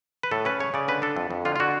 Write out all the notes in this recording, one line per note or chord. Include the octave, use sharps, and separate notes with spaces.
B4
A2 A4
C#4 B4
C#3 C#5
C#3 D5
D3 B4
D4 A4
F2
F2
D3 F4
F4
D3 F#4